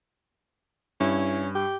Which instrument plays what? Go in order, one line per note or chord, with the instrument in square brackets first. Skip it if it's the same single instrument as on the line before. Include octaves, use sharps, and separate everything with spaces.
[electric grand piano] G2 [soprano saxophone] C#4 [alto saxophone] E4
[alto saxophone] G4